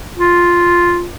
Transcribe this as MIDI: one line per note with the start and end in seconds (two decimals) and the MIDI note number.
0.17 1.08 65